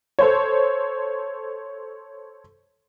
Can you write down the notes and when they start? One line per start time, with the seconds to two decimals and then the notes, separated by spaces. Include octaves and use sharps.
0.19 A4 C5 C#5